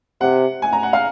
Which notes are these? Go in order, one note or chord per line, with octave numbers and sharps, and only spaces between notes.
C3 F#5
G#5
A#5
F#5
F5